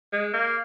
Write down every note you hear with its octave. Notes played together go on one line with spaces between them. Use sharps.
G#3
A#3